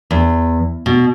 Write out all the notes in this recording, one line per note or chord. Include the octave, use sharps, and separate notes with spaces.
E2
B2